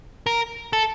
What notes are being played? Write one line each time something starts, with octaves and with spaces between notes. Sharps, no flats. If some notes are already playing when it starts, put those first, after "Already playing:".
A#4
A4